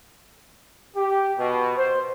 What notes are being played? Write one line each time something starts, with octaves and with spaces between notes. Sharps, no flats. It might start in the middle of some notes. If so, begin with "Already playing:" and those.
G4
B2
C5